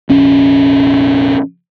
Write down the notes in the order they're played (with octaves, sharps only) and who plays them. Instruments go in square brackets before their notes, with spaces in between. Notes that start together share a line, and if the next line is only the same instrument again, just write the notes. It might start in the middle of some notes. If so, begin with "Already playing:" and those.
[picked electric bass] F1 A#1 C#4